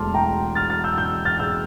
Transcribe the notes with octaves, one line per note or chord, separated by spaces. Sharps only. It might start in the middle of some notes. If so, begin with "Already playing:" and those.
Already playing: E1 E2 E3 A3 A5 C6 D6 F6
G5 A#5
F6 A6
F6 A6
E6 G6
E6 G6
F6 A6
E6 G6